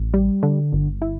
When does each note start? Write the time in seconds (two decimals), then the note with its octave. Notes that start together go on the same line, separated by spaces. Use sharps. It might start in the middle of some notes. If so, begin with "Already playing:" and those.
Already playing: A1
0.14 G3
0.43 D3
0.73 G1
1.02 E4